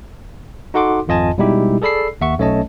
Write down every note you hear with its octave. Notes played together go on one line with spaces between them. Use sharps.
D#4 F#4 A4 F#5 C6 D6
G#1 F2 F4 D#5 G#5 A5
B2 G3 G#3 D#4 E4 G4
G#4 A4 D5 B5 E6 C7
D#2 E5 F#5 C#6
B1 A3 C#4 C#5 D#5 A5